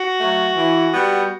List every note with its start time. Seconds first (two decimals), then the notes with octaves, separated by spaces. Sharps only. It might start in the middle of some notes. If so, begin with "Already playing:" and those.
Already playing: F#4
0.19 F#3 A3
0.57 E3
0.93 G3 B3